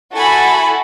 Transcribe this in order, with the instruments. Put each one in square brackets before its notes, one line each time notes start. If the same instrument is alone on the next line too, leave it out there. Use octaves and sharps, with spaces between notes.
[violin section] E4 F#4 A4 [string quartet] G#5 B5